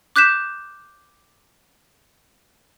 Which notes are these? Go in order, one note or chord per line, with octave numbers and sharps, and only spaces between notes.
D6 F#6 G6 B6 E7